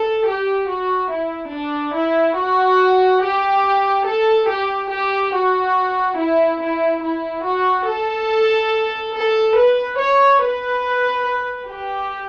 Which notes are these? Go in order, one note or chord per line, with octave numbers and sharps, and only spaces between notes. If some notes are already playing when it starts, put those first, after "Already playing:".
Already playing: A4
G4
F#4
E4
D4
E4
F#4
G4
A4
G4
G4
F#4
E4
E4
E4
F#4
A4
A4
B4
C#5
B4
G4